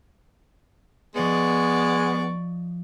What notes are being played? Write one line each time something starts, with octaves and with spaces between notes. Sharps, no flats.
F3 G#3 B3 D5 D#5 C#6